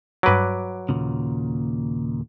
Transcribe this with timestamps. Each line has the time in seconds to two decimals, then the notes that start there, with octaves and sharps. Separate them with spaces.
0.23 G2 F#3 B4 D6
0.89 D#2 A#2 C#3